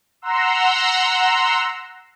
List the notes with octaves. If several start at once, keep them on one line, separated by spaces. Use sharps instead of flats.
F#5 A#5 C6 E6